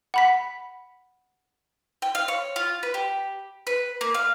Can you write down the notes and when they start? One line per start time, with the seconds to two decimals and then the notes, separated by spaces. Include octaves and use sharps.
0.14 F#5 B5 B6
2.02 G5
2.15 F5
2.28 C#5
2.56 F4
2.83 B4
2.94 G4
3.67 B4
4.01 A#3
4.14 F5